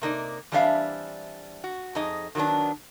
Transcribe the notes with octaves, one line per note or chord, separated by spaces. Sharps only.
C3 A#3 D#4 D5
E3 G3 C4 D4 E5 F5
F#4
F2 D#4 G#4 D#5
D#3 F#3 A#3 B3 D4